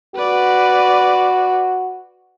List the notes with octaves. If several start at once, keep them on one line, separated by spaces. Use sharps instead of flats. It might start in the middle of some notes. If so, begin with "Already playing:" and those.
F#4 B4 D5